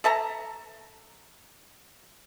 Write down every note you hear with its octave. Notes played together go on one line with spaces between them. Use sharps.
A4 E5 A5 A#5